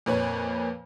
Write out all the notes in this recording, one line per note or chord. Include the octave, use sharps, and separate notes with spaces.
F2 A#2 B4 C#5